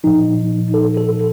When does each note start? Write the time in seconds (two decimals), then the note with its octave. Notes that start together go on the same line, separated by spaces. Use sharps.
0.04 A#2 F3 D#4
0.74 A4
0.97 A4